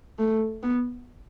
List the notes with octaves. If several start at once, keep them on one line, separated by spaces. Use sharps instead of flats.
A3
B3